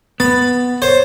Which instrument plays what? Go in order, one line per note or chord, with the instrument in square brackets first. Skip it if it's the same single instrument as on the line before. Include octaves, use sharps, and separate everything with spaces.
[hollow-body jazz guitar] B3 [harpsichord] B5 [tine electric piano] A6
[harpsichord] C5 [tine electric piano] C#5